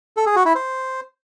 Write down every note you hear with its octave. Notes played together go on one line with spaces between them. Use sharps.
A4
G#4
F#4
E4
C5